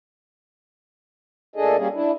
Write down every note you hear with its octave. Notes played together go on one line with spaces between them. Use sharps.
A#2 A3 D4 G#4 A4 D#5
G3 A#3 C#4 G#4
D4 E4